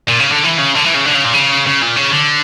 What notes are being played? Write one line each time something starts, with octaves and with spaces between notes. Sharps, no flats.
A#2
C#3
D3
E3
C#3
D3
E3
C#3
D3
C#3
A#2
C#3
C#3
A#2
C#3
D3